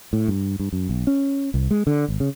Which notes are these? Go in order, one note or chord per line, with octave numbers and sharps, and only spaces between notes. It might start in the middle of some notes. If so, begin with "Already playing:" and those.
A2
G2
G2
F#2
B1
C#4
C2
G#3
D3
G#1
C#3